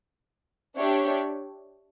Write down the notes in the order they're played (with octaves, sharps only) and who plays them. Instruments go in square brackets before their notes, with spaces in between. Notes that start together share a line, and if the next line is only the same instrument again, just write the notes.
[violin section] D4 G4 C#5 E5 G5